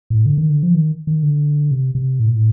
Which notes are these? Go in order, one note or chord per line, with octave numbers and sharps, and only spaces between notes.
A2
D3
D#3
D3
F3
D#3
D#3
D3
C3
C3
A2
A#2
A2